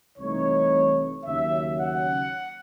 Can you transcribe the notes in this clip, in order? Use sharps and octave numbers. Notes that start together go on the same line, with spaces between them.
C2 C3 E3 A3 D#4 C#5
D#2 C#3 F#3 C#4 E5
F#5